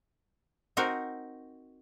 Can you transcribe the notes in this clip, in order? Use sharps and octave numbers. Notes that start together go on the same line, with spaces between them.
C4 D#4 F#4 A#4